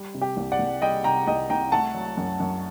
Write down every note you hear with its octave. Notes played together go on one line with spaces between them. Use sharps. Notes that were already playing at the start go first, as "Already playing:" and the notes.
Already playing: G3
C3
G4
C2
D5 F#5
C2
G3 D#5 G5
C3 G5 A#5
C2 D#5 G5
C2 G5 A#5
A3 F#5 A5
F#3
F#2
F#2